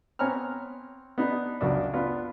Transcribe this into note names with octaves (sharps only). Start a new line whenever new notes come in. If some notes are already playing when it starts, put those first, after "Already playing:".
B3 C4 C#5 G#5 A#5 F6
B3 D4 D#4
C#2 F#2 D4
B3 D4 F4